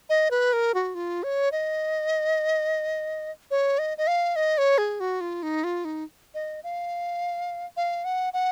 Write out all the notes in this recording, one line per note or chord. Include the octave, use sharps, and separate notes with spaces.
D#5
B4
A#4
F#4
F4
C#5
D#5
C#5
D#5
D#5
F5
D#5
C#5
G#4
F#4
F4
D#4
F4
D#4
D#5
F5
F5
F#5
F#5